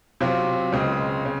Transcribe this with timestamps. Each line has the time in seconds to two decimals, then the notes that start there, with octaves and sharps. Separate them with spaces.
0.21 C3 F#3 C4 F4
0.72 C#2 C#3 G#3 C4
1.25 C#3